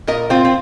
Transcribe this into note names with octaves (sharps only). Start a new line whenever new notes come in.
A#2 A#4 D#5
C4 F4
C4